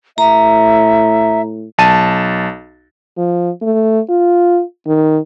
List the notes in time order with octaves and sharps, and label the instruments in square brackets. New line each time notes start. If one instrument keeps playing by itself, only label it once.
[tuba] A2 [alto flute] E5 [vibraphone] A#5
[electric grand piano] B1 A5 D#7
[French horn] F3
A3
F4
D#3